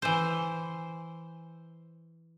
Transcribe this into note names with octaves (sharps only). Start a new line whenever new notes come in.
E3 C5